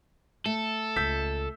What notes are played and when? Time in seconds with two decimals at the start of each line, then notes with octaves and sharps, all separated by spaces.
0.46 A3 A4
0.96 C#2 E6 G6 B6